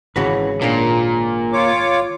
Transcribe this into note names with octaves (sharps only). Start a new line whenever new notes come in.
G#1 C#3 E3 F#4 B4
A#2 A#3 D4
F4 C#5 D6